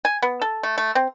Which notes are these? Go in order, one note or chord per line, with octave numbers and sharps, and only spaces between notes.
G#5
B3
A4
A3
A3
C4